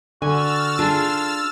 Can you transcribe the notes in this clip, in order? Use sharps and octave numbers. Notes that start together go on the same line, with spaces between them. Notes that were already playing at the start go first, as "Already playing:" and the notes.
D3 F#4 G#5 E6 F6 A6
D4 F4 G#4 A4